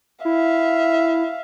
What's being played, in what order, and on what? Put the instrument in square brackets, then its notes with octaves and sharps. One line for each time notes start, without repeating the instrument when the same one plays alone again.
[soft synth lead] E4 [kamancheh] E5 F5